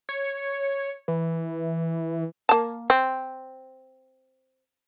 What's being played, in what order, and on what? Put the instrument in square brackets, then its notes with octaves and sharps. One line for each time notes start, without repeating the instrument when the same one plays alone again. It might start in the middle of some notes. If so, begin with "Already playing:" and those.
[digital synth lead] C#5
E3
[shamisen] A#3 A5
C4